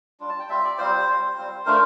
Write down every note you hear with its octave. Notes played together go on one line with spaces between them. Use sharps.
G3 D4 F4
A5
G5
G3 C4 F4 E5
D5
G3 C4 F4 C5
G3 C4 F4
G3 C4 F4
A3 D4 F4 A#4